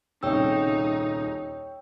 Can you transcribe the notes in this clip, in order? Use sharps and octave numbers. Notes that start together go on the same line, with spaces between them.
D#1 C2 C#3 D#4 C#5 G5 E6